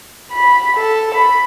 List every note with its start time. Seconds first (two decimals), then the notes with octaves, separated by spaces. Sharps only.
0.32 B5
0.77 A4
1.15 B5